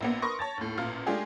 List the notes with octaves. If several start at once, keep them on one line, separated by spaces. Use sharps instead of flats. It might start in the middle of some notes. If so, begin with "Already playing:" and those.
A#1 A#3 B3
A#4 B4 C6 C#6 D#6 A#6
C#5 A5 A6
D#2 A2
A1 A#2 F5 F6
G#3 A3 D4 F4 G4 G#4